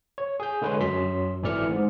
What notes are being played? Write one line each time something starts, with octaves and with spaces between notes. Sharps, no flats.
C#5
G#4 G6
D3 G#3 B4 C#5 G#5 C6
F#2 F#3 C6 B6
G#1 E3 A3 D5 F6 C#7
G#2